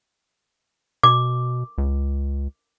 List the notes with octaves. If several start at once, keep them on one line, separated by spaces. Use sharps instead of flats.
B2 D6
C#2